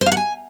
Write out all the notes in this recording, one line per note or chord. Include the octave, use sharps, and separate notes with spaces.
C5
F5
F#5
G#5